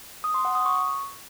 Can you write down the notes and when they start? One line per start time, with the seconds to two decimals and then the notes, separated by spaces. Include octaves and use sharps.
0.24 D#6
0.34 C6
0.45 F#5
0.55 D#6
0.66 C#6